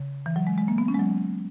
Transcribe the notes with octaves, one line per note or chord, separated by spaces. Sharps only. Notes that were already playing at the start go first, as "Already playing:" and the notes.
Already playing: C#3
E3
F#3
G#3
G#3
A#3
B3
C#4
G#3
F#3